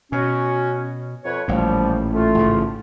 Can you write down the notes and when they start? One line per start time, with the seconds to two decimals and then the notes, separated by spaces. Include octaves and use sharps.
0.12 B2 C#4 F#4
1.24 F2 B4 C#5
1.48 A1 A#2 F3 G3
2.14 A3 F4
2.35 A1 G#2 C#3